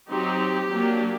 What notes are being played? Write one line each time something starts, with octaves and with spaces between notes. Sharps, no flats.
F#3 C4 D#4 G4
F#3 A#3 D4